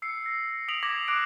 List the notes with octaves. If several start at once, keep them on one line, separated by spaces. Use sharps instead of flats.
E6 C7 C#7
A#6
D#6 B6 D7 F7 F#7
D6 G#6 A#6 C7 F#7
D6 D#6 F#6 D7